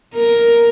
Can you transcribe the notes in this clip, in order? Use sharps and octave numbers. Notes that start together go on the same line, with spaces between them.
A#4